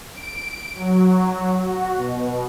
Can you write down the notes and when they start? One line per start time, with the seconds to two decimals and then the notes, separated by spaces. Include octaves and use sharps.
0.14 D7
0.75 F#3
1.59 F#4
1.96 B2